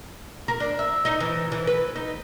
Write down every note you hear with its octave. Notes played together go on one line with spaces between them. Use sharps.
A#4
D4
E5
D#4
E3
E3
B4
D#4